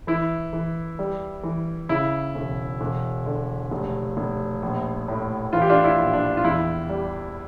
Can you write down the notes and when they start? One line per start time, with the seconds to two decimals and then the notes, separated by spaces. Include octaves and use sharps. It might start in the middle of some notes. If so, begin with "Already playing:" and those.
0.07 E3 E4
0.53 E3
0.99 G3
1.43 E3
1.89 C#3 E4
2.35 E1
2.81 E1
3.26 D3
3.71 F1
4.17 F1
4.63 A#1
5.08 A2
5.53 E3 F4
5.62 G4
5.70 D4 F4
5.84 E4
5.99 A#1
6.13 D4
6.37 F4
6.44 E2 E4
6.89 G3